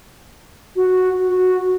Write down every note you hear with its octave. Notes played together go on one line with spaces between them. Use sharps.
F#4
F#4